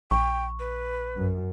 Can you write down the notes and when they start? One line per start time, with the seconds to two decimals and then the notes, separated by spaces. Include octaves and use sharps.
0.11 A#1 G5 C#6
0.60 B4
1.17 F#2